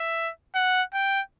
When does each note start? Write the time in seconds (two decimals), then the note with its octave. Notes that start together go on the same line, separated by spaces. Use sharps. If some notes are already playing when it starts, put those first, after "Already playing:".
Already playing: E5
0.55 F#5
0.94 G5